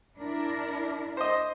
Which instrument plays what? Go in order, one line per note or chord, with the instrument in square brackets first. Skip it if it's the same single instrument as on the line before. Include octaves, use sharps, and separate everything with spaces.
[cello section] D4 E4 A#4
[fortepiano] C5 D#5